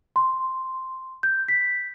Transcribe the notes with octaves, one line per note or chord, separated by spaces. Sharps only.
C6
G6
B6